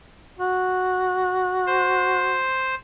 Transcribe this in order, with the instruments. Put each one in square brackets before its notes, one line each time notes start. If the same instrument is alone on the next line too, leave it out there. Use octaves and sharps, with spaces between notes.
[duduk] F#4
[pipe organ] C5